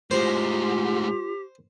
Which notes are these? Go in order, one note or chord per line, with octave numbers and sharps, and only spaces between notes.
A2 G#3 F4 G4 C5